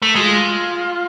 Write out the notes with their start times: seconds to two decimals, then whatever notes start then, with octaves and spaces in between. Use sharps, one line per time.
0.02 A3
0.15 G#3 F#4
0.20 F4